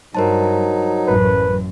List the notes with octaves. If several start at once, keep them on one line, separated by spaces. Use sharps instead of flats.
G2 F#3 D#4 A#4 C5 A5
A1 F#2 B4